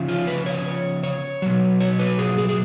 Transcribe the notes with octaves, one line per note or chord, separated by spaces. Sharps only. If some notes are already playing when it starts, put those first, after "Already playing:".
Already playing: C#3 F3
F4
B4
C#5
C#5
B2 F#3
C#5
B4
G#4
G#4
G#4